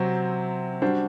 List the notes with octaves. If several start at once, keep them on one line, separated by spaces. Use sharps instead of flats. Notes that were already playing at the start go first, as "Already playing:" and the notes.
Already playing: C3 F#3 C4 F#4
G3 D4 F#4 C5